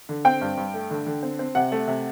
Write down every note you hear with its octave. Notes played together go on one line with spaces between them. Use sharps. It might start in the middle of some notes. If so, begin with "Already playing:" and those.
D3
C4 G5
G2
G2
A3
D3
D3
C4
C4
C3 F#5
A3
C3